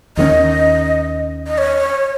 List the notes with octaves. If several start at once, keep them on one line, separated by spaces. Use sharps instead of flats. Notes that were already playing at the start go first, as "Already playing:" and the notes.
D#2 D#3 A#3 C#4 D#5
D#5
C#5